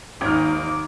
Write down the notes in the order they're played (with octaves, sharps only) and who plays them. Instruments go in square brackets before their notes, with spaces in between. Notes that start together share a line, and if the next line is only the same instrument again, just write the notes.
[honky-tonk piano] G#1 F6 [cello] D#2 D#4 [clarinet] D6